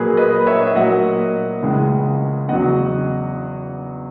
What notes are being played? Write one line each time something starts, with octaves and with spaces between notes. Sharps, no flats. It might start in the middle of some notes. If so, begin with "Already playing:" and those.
Already playing: A#2 F#3 A#3 G#4 B4
B4 D#5
C#5 E5
E5
A#2 F#3 A#3 D#5 F#5
C#2 C#3 E3 G#3
E2 C#3 F#3 D#5 F#5